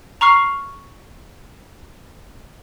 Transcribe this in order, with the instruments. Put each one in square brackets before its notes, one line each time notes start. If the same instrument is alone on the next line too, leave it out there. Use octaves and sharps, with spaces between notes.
[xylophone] A#5 C#6 F6 C7